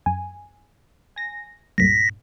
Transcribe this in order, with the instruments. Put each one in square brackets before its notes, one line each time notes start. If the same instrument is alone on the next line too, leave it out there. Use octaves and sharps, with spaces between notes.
[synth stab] F#2 G#5
G#5 A#6
[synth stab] C#2 G2 A#2 [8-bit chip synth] A#6 B6